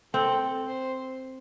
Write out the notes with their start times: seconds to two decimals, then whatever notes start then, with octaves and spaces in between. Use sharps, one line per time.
0.13 C4 A4
0.67 C5